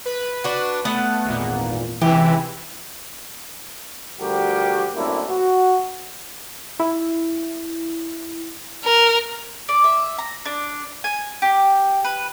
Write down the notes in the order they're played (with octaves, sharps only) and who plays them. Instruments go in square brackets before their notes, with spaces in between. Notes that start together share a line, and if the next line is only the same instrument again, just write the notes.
[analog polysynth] B4
[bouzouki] D4 F#4
[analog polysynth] A3 [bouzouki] B3 B4 F#5
[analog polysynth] G#1 E2 A#2
[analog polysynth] C#2 C3 E4 [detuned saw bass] E3 [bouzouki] G4
[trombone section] D2 F3 G3 F#4 G4 A#4
F#2 A3 A#3 C4 D4 E4
F#4
[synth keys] E4
[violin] A#4
[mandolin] D5
E5
A#5
D4
G#5
G4
B4